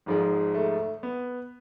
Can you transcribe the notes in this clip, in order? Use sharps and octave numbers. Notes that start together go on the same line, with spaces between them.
G#1 G#2 F3 G#3
A3
B3